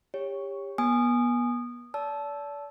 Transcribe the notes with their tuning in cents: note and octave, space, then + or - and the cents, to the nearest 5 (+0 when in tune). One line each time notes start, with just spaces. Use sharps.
G4 +30 C#5 +0
B3 -35 G#5 +0 D#6 -20
D5 -35 A5 -15 E6 +0